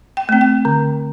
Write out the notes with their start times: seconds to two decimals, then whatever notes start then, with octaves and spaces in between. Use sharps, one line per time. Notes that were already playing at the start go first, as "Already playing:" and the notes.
0.17 G5
0.29 A3 C4
0.41 G5
0.65 D3